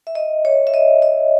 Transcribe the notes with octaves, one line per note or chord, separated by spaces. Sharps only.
E5
D#5
C#5
E5
D#5
D#5